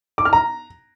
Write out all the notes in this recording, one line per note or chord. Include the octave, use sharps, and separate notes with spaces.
D6
F6
A#5